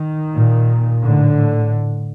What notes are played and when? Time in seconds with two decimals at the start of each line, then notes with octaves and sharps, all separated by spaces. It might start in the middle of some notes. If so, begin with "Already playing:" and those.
Already playing: D#3
0.35 A#2
1.05 A2 D3